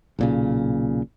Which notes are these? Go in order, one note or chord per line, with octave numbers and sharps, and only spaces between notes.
B1 A#2 C#3